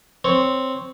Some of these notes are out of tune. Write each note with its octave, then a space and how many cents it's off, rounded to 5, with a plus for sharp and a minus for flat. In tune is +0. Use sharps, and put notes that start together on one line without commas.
C4 +0 C#5 +0